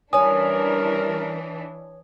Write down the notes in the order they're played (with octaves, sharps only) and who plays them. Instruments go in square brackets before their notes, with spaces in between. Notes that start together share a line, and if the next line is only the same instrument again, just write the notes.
[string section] E3 D4 [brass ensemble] G3 C#4 A#4 [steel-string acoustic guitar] C#5 G#5 [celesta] D#6